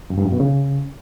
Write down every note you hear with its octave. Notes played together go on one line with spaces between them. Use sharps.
F#2
G2
F#2
B2
C#3